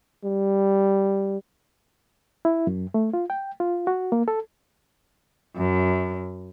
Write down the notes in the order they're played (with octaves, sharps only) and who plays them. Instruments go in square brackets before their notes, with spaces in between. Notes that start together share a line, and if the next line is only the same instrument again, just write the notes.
[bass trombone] G3
[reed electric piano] E4
F#2
A3
F4
G5
F4
F#4
A#3
A4
[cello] F#2